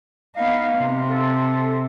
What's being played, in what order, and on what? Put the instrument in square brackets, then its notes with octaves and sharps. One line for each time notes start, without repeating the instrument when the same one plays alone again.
[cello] B3 D#4 [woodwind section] F5
[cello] C3
[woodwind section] A4